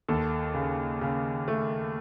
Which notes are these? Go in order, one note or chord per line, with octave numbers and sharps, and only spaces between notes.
D#2 A4
C#3
C#3
A3